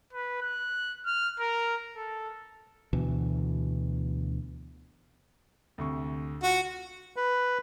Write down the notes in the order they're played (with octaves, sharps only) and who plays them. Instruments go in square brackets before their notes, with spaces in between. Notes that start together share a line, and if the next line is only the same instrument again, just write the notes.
[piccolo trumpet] B4
F#6
F6
A#4
A4
[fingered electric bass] D2 B2 E3
[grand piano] D2 C3 C#6
[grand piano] F4 [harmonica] F#4
[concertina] B4